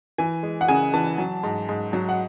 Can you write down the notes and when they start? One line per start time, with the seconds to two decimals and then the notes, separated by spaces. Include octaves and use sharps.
0.18 E3 G#5
0.43 G#3
0.61 F#5
0.68 C#3 G#5
0.93 E3 A5
1.18 F#3
1.43 G#2
1.69 G#2
1.93 F#3
2.09 F#5